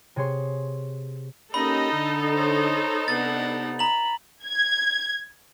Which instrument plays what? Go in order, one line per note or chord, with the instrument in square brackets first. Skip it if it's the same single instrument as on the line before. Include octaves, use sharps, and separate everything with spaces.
[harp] C3 G#4 C#5 C6
[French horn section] A#3 C#4 G4 [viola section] D#4 A4 [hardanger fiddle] D#5 [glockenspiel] B5
[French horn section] D3
[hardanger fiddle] C5 C#5
[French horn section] C3 B3 [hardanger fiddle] D4 F#5 [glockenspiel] A6
[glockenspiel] A#5 F#7 [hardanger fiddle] B5
[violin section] G#6